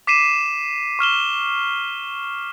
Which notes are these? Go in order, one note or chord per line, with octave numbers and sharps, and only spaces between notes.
D6 B6 C7 D#7 E7
C#6 F6 E7 G7